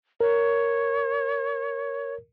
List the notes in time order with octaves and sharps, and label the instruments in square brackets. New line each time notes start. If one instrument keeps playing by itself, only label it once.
[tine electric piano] A#4 [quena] C#5